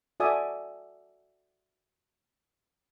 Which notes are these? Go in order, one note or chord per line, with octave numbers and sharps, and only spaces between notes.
F#4 A4 D5 E5 G#5 D#6